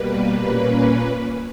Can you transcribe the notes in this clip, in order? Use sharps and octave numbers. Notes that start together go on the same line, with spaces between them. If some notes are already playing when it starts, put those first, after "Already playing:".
Already playing: B2 G3 A#3 B4
A#2 A#3 C#4 B4